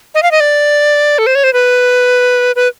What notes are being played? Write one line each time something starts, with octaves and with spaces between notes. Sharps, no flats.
D#5
F5
D#5
D5
A4
C5
C#5
C5
B4
B4